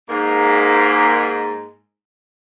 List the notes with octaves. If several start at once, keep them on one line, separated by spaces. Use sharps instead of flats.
G#2 A#3